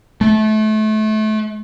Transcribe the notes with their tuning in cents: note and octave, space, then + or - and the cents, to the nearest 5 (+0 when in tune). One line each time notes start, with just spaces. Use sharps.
A3 -30